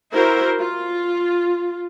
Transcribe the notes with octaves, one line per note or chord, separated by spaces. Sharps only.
E4 F#4 A#4 C5
F4